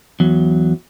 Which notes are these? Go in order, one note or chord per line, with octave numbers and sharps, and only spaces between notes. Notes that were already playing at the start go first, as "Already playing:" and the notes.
E2 F#3